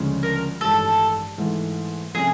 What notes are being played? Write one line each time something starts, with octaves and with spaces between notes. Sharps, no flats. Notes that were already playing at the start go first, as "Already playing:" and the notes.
Already playing: D2 C#3 F3 G#3 C#4
A#4
A1 G2 D#3 G#3 A4
G#2 E3 A3
C3 F3 A3 C#4 G#4